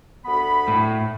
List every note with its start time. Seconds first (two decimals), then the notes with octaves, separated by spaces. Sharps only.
0.25 D2 B3 B5
0.68 A2